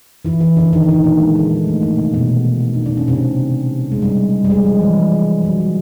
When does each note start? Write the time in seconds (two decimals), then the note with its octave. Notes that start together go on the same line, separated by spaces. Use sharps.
0.25 E3 E4
0.40 E3 E4
0.57 D3 D4
0.73 D#3 D#4
0.89 D3 D4
1.04 A#2 A#3
1.20 G#3
1.36 G#3
1.51 G#3
1.67 A3
1.82 A#2 A#3
1.98 C3 C4
2.14 B2 B3
2.73 D#4
2.86 D4
2.97 C#4
3.08 C3 C4
3.92 G#3
4.02 G3
4.44 G3
4.50 G#3
4.65 F3
4.81 E3
5.44 F#3
5.60 G3